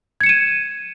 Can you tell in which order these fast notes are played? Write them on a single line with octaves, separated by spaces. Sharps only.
G#6 C#7 E7 D#7